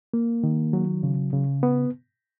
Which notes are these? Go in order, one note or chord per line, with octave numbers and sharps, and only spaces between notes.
A#3
D#3
F#3
C#3
C#3
B3